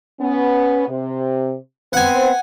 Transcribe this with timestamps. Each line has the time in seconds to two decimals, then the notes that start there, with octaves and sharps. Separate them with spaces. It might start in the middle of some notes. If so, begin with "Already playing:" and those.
0.19 B3 C#4
0.88 C3
1.93 B3 C4 C5 F#5 G#5